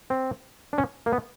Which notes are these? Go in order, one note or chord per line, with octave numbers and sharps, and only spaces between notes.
C4
D4
C#4
A#3
B3